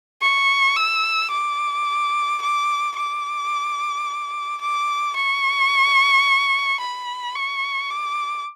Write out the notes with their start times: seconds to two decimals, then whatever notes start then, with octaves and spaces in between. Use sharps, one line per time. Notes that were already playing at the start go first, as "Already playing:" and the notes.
0.22 C#6
0.77 E6
1.31 D6
2.42 D6
2.97 D6
4.61 D6
5.16 C#6
6.80 B5
7.36 C#6
7.91 D6